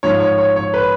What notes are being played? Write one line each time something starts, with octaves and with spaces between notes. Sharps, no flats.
G#2 F3 C#5
C#5
C#5
C#5
B4